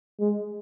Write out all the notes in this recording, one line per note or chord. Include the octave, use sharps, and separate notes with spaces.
G#3